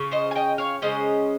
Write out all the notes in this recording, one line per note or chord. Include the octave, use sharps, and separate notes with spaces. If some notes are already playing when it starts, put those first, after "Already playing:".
Already playing: C#3 C#4 F4
C5 D#5
G#5
D#5 G5
C#5 F5
C#3 G#3 C#4 C5 D#5